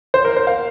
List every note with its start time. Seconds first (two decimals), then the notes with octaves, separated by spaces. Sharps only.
0.14 C5
0.25 A#4
0.37 C5
0.47 F5